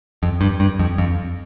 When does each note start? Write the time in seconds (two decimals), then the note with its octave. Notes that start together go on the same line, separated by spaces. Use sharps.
0.23 F2
0.41 G2
0.60 G2
0.79 F2
0.98 F2